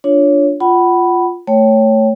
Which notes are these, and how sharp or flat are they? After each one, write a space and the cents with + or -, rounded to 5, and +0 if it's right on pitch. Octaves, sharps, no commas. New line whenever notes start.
D4 +0 F4 +0 C#5 +10
F4 +0 F#5 +30 B5 +0
A3 +5 C#5 +0 G5 +0